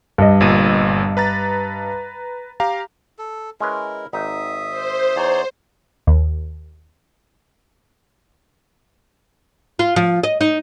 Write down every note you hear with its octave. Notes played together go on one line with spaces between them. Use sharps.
G2 D#5
G1 A#2 D#7
B4 A#5 A6
G4 F5 A#5
A4
G#3 C#4 E4 A#4 B4
G#1 D#4 E5 D#6
C5
E2 D#4 C#5 D5
D#2
F4
F3
D#5
D#4